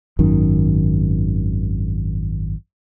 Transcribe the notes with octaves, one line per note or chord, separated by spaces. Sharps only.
G#1 F#2 D#3